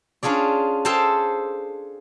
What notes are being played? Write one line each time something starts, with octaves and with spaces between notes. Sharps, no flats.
C#4 D4 F4 G#4 D5
G#4 A4 C5 F5 G5 A5